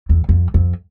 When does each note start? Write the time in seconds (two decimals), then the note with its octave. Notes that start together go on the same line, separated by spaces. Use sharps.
0.09 E2
0.29 F2
0.54 F2